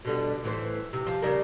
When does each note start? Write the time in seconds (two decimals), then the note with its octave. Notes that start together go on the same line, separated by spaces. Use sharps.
0.05 B2 D3 G3
0.43 A2 E3 C5
0.93 C3
1.07 F3
1.22 C#3 G3 A#4